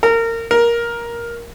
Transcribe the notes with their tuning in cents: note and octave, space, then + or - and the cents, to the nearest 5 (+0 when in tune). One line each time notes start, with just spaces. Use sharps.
A#4 -25
A#4 +10